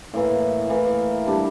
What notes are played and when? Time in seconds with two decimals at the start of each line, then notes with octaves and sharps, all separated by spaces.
0.14 A2 E3 A#3
0.70 A2 E3 A#3
1.27 G3 D4 A4